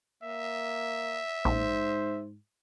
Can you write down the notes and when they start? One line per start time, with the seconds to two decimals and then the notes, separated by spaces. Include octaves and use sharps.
0.23 A#3 E5
1.45 A#1 G#2 C5